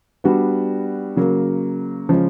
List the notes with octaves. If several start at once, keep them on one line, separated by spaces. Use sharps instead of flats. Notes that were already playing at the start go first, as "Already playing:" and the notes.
G3 B3 D4 F#4
C#3 F#3 A#3
C#3 F3 G#3 C#4